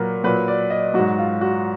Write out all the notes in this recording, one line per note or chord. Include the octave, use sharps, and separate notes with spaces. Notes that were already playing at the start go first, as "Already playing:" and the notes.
Already playing: A#2 F#3 A#4 B4
A#2 F#3 B4
D5
D#5
G#2 F#3 F#4
F4
F#4